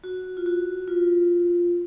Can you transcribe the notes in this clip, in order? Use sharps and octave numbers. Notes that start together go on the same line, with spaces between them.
F#4
F4
F#4
F4